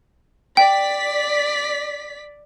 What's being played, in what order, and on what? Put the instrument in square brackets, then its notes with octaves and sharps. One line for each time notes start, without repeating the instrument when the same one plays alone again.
[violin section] D5 B6 [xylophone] G5